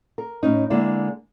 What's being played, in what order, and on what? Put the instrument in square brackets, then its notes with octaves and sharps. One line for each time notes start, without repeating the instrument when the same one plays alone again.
[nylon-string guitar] A#4
A2 C#4 D#4
D3 G#3 A#3 E4